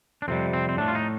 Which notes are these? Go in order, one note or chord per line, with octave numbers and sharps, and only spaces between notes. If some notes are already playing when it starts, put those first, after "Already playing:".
D4
F2 C3 G3 C4
C4
C4
A2 A3 D4
F4
D#4